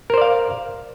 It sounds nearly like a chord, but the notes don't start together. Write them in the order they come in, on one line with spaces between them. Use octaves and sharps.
A#4 C5 D5 F5